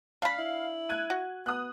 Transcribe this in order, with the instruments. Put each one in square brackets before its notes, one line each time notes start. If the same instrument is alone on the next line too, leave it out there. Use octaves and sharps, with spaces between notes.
[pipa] D4 B5 [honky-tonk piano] F5
[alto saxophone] E4
[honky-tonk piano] F#6 G#6 D#7
[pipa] F#4
[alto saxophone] B3 [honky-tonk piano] D#6 F#6